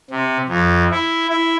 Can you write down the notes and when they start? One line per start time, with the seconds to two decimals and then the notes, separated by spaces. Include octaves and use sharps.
0.11 C3
0.49 F2
0.90 E4
1.29 E4